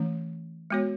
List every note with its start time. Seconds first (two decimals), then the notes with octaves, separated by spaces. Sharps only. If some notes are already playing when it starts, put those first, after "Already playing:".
Already playing: E3 A3 C#4
0.70 G#3 B3 F#4 C#5